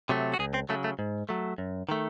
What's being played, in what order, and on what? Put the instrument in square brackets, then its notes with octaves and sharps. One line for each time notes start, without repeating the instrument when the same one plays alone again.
[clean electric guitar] C3 F#3 A3
F#4
C#2 G#4
C4
C#3 F#3 A3
A3
G#2
F#3 A3
F#2
D#3 A3